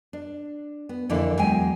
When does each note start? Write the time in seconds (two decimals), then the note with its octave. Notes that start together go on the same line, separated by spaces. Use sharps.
0.13 D4
0.89 B3
1.09 F2 D3 E3 A#3 D4 E4
1.38 E2 F#3 G#3 G5 G#5